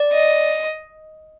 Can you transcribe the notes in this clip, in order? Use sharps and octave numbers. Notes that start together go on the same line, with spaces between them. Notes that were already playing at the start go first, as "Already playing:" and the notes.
Already playing: D5
D#5